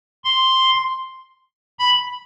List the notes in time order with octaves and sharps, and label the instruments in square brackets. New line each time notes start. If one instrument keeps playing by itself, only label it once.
[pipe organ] C6
B5